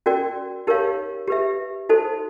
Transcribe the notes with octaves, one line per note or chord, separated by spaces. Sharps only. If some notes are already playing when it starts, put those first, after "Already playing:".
C#4 F#4 A#4 D5 G5
D#4 G4 A#4 C#5 F5
G4 B4 E5
D#4 F#4 A4 C5